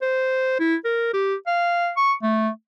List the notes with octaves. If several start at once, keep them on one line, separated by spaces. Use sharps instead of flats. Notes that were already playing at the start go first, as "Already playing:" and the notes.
C5
E4
A#4
G4
F5
C#6
A3